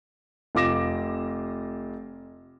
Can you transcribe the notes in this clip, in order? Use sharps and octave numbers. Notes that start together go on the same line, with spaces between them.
F1 F4 D6 A#6 E7